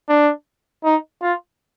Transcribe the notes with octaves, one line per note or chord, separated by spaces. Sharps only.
D4
D#4
F4